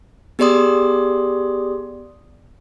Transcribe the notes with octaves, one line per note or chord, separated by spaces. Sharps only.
B3 G4 G#4 D5 C6 D#6